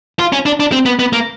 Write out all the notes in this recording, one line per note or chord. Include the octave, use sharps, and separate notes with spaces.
F4
C#4
D4
D4
C4
B3
B3
A#3